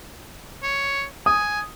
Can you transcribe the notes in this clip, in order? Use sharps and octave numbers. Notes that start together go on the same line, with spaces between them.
C#5
G#5 D#6